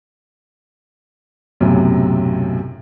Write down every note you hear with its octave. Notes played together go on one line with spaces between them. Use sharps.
B1 F#2 A2 C3